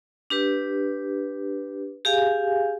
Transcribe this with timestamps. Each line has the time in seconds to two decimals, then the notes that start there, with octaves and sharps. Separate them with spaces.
0.30 D4 G4 B4
2.05 G4 G#4 F5 G#5